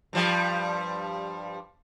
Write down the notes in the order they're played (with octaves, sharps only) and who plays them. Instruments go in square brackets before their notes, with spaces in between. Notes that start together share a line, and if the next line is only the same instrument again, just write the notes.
[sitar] G2 F3 G3